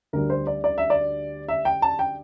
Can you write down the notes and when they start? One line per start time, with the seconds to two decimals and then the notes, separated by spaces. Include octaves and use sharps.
0.13 D2 D3 G3 A#4
0.30 C5
0.47 D5
0.64 D5
0.78 E5
0.90 D5
1.48 E5
1.65 G5
1.82 A5
1.99 G5